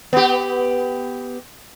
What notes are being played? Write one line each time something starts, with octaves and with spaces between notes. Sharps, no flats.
B3 G4